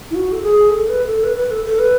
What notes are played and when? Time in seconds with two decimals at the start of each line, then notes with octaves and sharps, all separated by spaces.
0.11 E4
0.15 F#4
0.32 A4
0.42 G#4
0.70 A4
0.89 B4
1.07 A4
1.24 B4
1.37 B4
1.51 A4
1.66 A4
1.79 B4